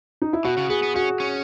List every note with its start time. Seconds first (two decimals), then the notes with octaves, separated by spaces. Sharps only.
0.22 D#4
0.33 E4
0.45 B2 F#4
0.57 C#3
0.69 B3 G#4
0.83 B3
0.95 C#4 F#4
1.20 C#4